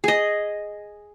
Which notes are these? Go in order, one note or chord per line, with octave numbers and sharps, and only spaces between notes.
G#4 D#5